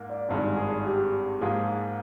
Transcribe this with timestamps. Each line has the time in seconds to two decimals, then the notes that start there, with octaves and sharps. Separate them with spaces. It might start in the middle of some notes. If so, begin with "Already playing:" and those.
Already playing: G#2 A#3
0.09 D5
0.29 G#1 G2 D#3 G#3
0.57 G#4
0.86 G4
1.41 G#2 F3 A#3 G#4